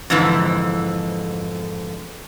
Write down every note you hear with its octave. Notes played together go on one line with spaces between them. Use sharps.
F2 G#2 D3 E3